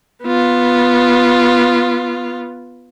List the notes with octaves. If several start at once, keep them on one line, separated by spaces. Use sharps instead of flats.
B3 F4